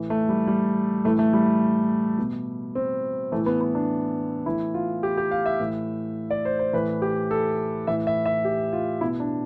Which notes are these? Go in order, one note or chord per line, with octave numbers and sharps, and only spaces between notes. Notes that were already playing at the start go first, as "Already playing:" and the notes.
Already playing: A2 E3
A3
G3
G3
A2 E3 A3
A3
G3
B2
C4
A2 E3 A3
B3
B3
D4
A2 E3 E4
F4
G4
G4
F5
E5
A2 E3
D5
C5
C5
A2 E3 B4
G4
A4
A2 E3 E5
E5
E5
G4
F4
B2 E4
D4